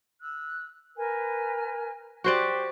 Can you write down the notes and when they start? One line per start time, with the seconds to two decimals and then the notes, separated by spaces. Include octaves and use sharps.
0.20 E6 F#6
0.96 A#4 B4 G#5
2.24 F#4 G4 C5 D5